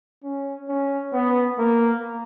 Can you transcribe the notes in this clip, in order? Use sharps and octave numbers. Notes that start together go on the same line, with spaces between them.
C#4
C#4
B3
A#3